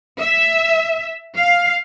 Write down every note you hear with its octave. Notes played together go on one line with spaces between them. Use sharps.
E5
F5